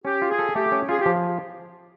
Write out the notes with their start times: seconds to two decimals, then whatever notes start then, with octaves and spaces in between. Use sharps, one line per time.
0.05 C#4 G4
0.22 F4
0.30 G#4
0.39 A4
0.55 A3 G4
0.72 C#4
0.89 F4 G#4
1.00 G4
1.06 F3